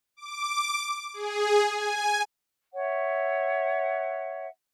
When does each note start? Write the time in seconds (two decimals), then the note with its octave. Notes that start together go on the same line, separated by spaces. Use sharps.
0.17 D6
1.14 G#4
1.64 G#5
2.73 C#5 E5 F#5